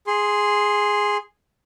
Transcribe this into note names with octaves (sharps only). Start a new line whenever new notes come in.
G#4 C6